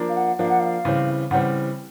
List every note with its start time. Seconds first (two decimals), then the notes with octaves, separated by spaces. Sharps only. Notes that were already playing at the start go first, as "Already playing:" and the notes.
Already playing: F3 A#3 D4
0.09 F5
0.16 F#5
0.39 F3 A#3 D4 F5
0.49 F#5
0.59 F5
0.85 C#3 E3 G3 C4
1.31 C#3 E3 G3 C4 F#5